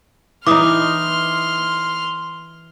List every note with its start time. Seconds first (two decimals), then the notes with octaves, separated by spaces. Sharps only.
0.47 E3 D#4 C6 D6 D#6 F6